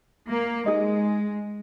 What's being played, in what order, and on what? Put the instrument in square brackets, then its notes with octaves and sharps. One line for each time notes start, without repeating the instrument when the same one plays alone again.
[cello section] A#3
[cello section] G#3 [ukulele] D#4 G#4 D#5